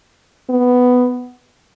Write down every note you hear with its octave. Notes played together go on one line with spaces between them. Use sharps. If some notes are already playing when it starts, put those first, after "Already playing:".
B3